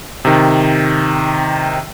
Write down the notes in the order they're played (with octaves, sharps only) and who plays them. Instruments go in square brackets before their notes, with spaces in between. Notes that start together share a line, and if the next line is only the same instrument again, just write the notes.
[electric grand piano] C3 D#3